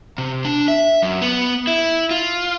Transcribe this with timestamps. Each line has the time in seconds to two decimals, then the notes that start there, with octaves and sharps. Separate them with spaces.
0.18 C3
0.45 D4
0.68 E5
1.03 F#2
1.22 B3
1.67 E4
2.11 F4